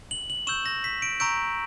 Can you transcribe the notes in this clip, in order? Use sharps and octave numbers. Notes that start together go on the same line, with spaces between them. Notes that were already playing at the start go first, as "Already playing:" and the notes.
F#7
F#7
C#6 E6 G6 E7
A#6
B6
D7
A#5 C#6 E6 G6 D7